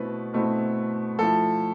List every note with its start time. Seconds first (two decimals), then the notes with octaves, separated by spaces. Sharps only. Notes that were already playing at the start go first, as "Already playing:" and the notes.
Already playing: B2 A3 C4 E4 B4
0.33 B2 A3 C4 E4
1.19 F3 A3 E4 A4